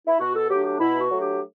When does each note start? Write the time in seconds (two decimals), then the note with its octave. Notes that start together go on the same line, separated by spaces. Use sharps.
0.07 E4
0.20 B2 F#4
0.35 A4
0.50 F#3 A3 D4 G4
0.65 G4
0.80 B2 E4
1.00 F#4
1.11 F#3 A3 D4
1.21 G4